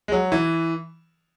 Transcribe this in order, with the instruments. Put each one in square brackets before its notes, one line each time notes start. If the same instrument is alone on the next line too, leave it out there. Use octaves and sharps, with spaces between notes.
[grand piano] G#3
F#3
E3